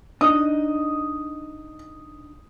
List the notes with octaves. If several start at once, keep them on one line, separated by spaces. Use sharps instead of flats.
D4 D#4 D#5 D#6